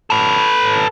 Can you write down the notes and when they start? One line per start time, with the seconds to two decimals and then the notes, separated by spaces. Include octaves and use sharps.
0.10 A4 B4